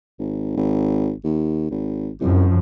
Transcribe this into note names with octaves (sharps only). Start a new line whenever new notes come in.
G#1
G#1
D#2
G#1
C2 F#2 F3